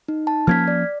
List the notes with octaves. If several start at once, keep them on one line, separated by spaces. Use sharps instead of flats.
D#4
A5
F3 A#3 C#4 F6 G#6 B6
D5